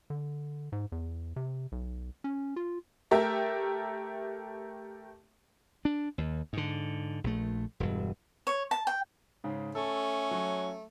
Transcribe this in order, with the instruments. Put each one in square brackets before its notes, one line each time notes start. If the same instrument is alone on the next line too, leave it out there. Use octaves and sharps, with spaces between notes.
[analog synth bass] D3
G#2
E2
C3
B1
C#4
F4
[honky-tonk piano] A3 G4 A#4 E5
[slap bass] D4
D#2
G#2 D3
A#1 A3
E1 G2
[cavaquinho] C#5
A5
G5
[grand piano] G#2 C#3
[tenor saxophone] A3 [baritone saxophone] C#4 [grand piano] A4
[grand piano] F#3